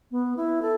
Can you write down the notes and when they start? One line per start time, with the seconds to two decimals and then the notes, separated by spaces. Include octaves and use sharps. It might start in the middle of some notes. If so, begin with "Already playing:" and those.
0.11 B3
0.37 E4
0.62 A4